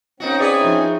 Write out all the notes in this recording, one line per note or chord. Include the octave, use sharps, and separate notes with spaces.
A#3 C4 C#4 D#4 F#4
E4 G#4 B4 C#5 D5
F3 D#4